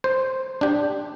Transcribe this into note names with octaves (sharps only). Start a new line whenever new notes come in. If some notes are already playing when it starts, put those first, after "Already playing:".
C5
D4 G4